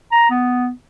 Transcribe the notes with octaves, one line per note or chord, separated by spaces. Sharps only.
A#5
B3